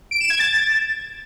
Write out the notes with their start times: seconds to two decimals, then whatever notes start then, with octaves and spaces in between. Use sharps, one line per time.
0.11 D7
0.20 E7
0.30 G#6
0.39 A6